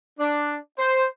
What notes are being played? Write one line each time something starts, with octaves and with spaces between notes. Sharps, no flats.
D4
C5